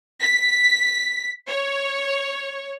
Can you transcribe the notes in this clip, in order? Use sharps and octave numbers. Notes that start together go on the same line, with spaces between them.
B6
C#5